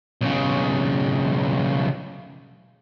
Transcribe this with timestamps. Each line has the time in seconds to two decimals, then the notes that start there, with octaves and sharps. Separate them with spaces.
0.21 B1 C#3